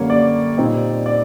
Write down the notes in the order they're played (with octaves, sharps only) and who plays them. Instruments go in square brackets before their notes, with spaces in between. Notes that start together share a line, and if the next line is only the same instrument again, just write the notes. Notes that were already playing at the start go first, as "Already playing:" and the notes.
Already playing: [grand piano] F#2 D3 G3 A#3 C#5
D5
A#2 G3 C4 D#4
D5